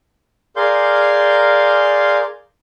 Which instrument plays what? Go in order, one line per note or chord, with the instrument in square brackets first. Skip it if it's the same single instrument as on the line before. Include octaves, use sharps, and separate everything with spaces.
[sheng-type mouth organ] G#4 A#4 D5 F5 C6 G6